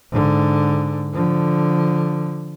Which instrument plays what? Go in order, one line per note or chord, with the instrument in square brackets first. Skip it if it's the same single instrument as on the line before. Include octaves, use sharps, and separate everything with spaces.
[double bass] G#2 D3
D3 F3